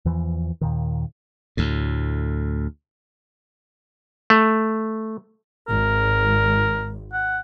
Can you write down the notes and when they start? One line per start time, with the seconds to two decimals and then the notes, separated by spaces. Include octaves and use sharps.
0.05 E2 E3 F3
0.61 D#2 A#2 D#3
1.57 D2 A2
4.30 A3
5.68 G#1 A#4
7.13 F#5